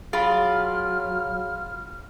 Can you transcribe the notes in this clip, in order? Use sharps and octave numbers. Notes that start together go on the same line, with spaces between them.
F#3 F4 G#4 B5 F6